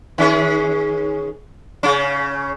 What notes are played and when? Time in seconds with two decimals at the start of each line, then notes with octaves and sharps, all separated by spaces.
0.18 D#3 C#4 G#4
1.83 C#3 C#4